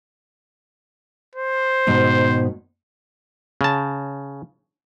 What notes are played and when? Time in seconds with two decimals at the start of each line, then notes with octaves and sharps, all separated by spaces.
1.35 C5
1.87 G#2 B2 D#3
3.61 C#3 A5